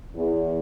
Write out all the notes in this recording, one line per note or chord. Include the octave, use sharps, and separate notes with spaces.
E2